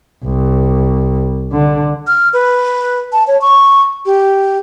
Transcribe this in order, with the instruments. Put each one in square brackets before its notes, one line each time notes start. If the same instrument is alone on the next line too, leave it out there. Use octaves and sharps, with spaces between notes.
[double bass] C2
D3
[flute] F6
B4
A5
C#5
C#6
G4